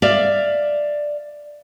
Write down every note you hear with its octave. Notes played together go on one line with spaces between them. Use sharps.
D5 E5 F5